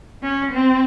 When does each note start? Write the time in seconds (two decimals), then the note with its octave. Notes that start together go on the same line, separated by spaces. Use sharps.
0.23 C#4
0.52 C4